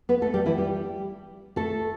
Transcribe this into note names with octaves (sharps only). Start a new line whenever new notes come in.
B3 B4
A3 A4
G3 G4
E3 E4
G3 G4
A3 A4